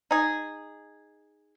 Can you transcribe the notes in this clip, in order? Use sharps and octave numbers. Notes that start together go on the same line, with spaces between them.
D#4 G#4